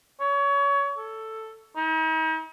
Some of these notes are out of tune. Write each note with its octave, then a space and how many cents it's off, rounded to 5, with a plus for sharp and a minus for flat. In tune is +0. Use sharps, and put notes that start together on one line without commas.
C#5 +25
A4 +5
D#4 +45